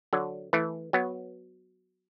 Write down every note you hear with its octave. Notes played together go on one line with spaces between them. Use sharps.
D3 F#3
E3 A3
F#3 B3